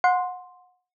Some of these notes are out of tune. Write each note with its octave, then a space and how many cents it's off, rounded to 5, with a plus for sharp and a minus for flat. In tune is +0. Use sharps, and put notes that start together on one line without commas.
F#5 -30 C6 +0